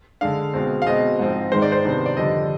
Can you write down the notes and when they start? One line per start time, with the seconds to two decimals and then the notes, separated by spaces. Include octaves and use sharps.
0.21 D3 G#3 D4 F5
0.54 B2 G#3 C4
0.82 F5
0.86 B2 G#3 C4 D#5
1.19 G#2 F3 C4
1.52 G#2 D#3 G#3 C5
1.62 D5
1.72 C5
1.84 C3 D#3 B3 D4
2.06 D5
2.16 F2 D3 G3 D#5